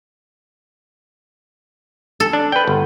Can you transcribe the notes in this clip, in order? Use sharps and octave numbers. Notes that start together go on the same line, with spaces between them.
A4
D4
B4 G5
G1